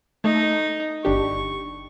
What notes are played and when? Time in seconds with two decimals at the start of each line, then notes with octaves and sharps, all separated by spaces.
0.24 A3 D#4
1.05 G1 D4 G4 C#6